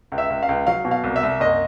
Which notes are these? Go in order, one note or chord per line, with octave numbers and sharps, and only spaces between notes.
C#2
E5
C#2
F5
C#2
F#3 F5
B2
F5
C2
E5
C2
F#1 D#5